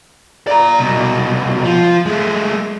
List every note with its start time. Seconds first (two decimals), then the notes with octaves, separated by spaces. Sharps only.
0.47 D5 A#5
0.79 C2 B2
1.64 F3
2.06 G#3 A3